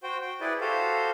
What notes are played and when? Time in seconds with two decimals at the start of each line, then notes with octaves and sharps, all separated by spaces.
0.03 F#4 C5 G5
0.21 G5
0.41 E4 G#4 B4 D5
0.61 F#4 G4 A4 C5 F5